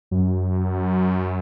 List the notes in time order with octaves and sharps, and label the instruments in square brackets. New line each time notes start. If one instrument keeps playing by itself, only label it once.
[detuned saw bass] F#2